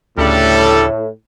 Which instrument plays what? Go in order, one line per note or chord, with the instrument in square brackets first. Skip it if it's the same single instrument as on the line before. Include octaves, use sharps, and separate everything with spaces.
[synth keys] D2 C#3 F#6 [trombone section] A2 [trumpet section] G3 A4